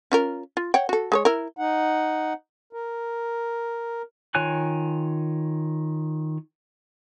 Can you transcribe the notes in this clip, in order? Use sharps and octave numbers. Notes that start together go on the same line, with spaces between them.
C#4 F4 A#4
F4
C#5 F#5 G5
F#4 A4
G#3 B4 C#5
E4 A#4
D#4 F#5
A#4
D#3 F4 C#5 G#5 F#6